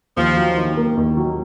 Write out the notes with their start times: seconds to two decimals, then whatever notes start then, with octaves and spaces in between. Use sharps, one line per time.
0.17 D#2 F3
0.36 F#3
0.57 D#3
0.77 A#3
0.97 D#2
1.17 F#3